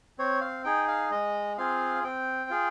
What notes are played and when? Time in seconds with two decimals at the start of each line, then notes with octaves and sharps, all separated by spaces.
0.18 C4 C#5
0.41 F5
0.64 D#4 G#4 G5
0.88 F5
1.11 G#3 D#5
1.58 C4 F4 G#4 F5
2.04 C4 G5
2.50 F4 G#4